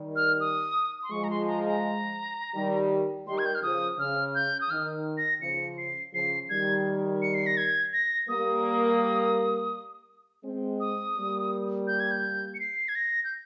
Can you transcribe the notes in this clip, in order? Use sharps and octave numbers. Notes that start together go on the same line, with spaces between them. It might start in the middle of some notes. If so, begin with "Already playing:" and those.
Already playing: D#3 G3
F6
D#6
C6
F3 G#3 C#6
A#5
C6
A#5
A#5
D#3 G3
D#3 G3 C6
G#6
G6
F6
C#3 F3 D#6
C#3 F6
G6
D#6
D#3 F6
A#6
C#3 F3 C#7
C7
C#3 F3 C7
D#3 G3 G#6
C#7
C7
A#6
G#6
A#6
G3 A#3 D#6
G#3 C4
D#6
G3 A#3
G6
G#6
G6
C#7
C7
G#6
A#6
G6